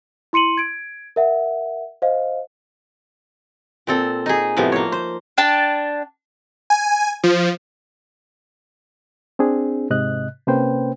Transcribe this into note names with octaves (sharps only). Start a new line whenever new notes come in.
E4 C6 C#7 D#7 F#7
G#6 D7
A#4 E5 F#5
C5 D#5 F5
A#2 C4 A4
D#4 G#4
A2 C3 F3 B3
A#3 C#5
C5
D4 G5 A5
G#5
F3
C4 D4 G#4
G#2 C3 D#5 F#6
C3 A#3 C#4 B4 C5 G5